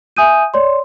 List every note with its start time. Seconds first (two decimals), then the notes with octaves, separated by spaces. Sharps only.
0.17 E5 G#5 D#6 G6 D#7
0.54 C#5 D5 C6